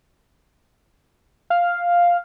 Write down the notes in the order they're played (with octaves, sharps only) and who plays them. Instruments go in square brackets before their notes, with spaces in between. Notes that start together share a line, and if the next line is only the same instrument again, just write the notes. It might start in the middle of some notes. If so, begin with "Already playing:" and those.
[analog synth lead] F5